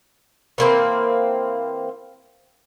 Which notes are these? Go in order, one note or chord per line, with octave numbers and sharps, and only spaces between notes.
E3 A#3 C4